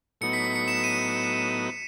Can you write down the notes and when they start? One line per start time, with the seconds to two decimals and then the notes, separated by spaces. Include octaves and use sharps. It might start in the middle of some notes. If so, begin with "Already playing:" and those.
0.21 A2 F#3 B3 D#4 C#7
0.33 B6
0.45 B6
0.56 C#7
0.68 E7
0.84 D#7